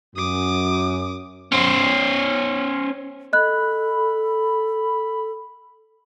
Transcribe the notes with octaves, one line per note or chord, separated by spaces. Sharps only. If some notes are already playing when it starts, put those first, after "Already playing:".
F#2 D6 D#6
C#4 C5
A4 D#5 B5 F#6